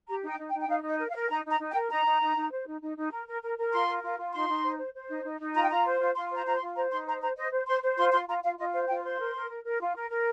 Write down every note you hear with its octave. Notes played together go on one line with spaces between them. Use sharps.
G4 A#5
D#4 G5
D#4
G5
D#4
G5
D#4 F5
D#4
D#5
A#4
F5
A#4
D#4 A#5
D#4 A#5
D#4
G5
A#4
D#4 A#5
D#4
D#4
D#4
C5
D#4
D#4
D#4
A#4
A#4
A#4
A#4
F4 C6
A#4
F4
F4
D#4 C6
D#4
C5
C5
C5
D#4
D#4
D#4
F4 A#5
G5
F4 A#5
C5
F4
F4 C6
C5 A#5
F4 A#5
C6
F4
C5 A#5
D#4 C6
C5 A#5
C5 A#5
C5 D#5
C5
C5 C6
C5
F4 C6
F4 C6
F4 A#5
F4 F5
F4 D#5
C5 F5
F4 G5
C5 C6
A#4
A#4
A#4
A#4
F4
A#4
A#4